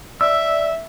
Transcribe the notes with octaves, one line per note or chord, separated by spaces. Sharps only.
D5 E5 E6